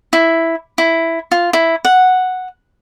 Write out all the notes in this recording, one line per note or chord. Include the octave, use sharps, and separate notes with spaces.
E4
E4
F4
E4
F#5